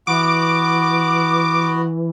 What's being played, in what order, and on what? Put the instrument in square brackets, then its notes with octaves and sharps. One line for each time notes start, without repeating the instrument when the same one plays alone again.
[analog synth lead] E3 [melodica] B3 F#4 [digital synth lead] D6